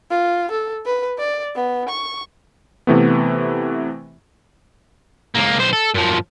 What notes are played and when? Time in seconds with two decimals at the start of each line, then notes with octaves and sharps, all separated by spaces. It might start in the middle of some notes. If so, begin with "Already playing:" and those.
0.11 F4
0.51 A4
0.85 B4
1.18 D5
1.56 B3
1.89 C#6
2.87 C3 E3 A3 B3
5.35 C#2 A#3
5.58 B1 C5
5.73 A4
5.94 F#2 F3